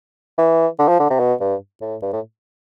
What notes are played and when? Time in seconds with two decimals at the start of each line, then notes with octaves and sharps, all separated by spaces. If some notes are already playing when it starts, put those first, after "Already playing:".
0.38 E3
0.79 D3
0.89 F3
0.99 D3
1.10 C3
1.19 B2
1.40 G2
1.81 A2
2.02 G2
2.13 A2